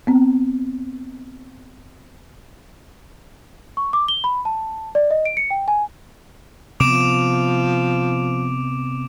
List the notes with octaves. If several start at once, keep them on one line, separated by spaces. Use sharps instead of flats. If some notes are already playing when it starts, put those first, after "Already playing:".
B3 C4
C#6
D6
G7
B5
A5
D5
D#5
D7
C#7
G5
G#5
C3 F3 B3 D6 D7 E7